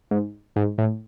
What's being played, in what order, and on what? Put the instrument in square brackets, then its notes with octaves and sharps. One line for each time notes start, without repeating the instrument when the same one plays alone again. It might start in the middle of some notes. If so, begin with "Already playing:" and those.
[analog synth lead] G#2
G#2
A2